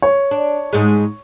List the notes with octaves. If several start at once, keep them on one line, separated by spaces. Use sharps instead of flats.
C#5
D4
G#2 G#3